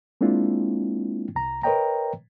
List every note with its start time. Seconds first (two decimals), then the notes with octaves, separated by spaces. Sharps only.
0.21 G#3 A#3 C4 D4 E4 F4
1.35 C2 A#5
1.63 A#4 B4 C#5 D#5 G5 A#5